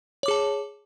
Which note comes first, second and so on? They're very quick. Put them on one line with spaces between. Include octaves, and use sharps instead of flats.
C#5 D6 G#4 A5